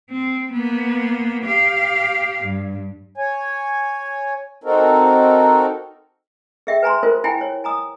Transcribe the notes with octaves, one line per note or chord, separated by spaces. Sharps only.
C4
A#3 B3
G4 F5
G2
C#5 G#5
C4 D#4 F#4 A4 A#4
G#4 E5 G5
B4 G#5 A#5 C6
F4 A#4 C5
E4 G5 G#5 B5
C#5
G#5 A#5 D#6